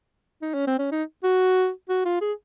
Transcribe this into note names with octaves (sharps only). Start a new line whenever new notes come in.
D#4
C#4
C4
C#4
D#4
F#4
F#4
F4
G#4